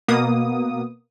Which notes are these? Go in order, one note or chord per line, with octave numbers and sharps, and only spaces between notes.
B2 A#3 B3 D#6